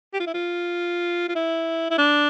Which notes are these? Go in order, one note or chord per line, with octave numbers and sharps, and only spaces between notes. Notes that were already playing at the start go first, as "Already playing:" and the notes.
G4
F4
E4
F4
F4
E4
E4
D4